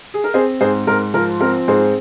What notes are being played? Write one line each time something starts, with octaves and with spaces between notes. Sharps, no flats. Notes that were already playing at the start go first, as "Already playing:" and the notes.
G#4
A#4
C4 G#4 C5
G#2 G#4 C5
G#2 A#4
F3 A#4
C4 A#4
G#2 G#4 C5